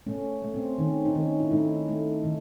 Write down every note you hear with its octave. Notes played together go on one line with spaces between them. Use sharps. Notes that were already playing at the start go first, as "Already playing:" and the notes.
A3 C#4
A3
C4
D#3 C#4
D#4
D#3 C#4
E4
A3 D#4
A3
D#3